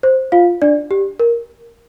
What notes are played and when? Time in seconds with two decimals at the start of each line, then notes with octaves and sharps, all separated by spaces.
0.03 C5
0.32 F4 F5
0.62 D4 D5
0.91 G4
1.20 A#4